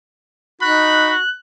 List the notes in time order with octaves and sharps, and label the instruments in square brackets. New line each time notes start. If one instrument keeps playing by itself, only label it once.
[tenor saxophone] D#4 [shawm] F#4 [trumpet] B5 [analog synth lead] F#6